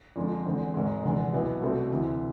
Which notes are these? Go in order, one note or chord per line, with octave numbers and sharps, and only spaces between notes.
F2 D3 F3 G#3
E2 D3 G#3 C4
G#1 G#2 G#3
F1 E2 D3 G#3
B1 B2 B3 E4
C2 B2 A3 C4
D2 C3 E3